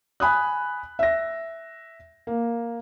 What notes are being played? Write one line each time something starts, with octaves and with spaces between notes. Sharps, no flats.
G#5 B5 D#6 F#6
E5 A#6
A#3